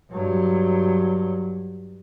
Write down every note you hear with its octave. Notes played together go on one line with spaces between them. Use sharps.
G2 F#3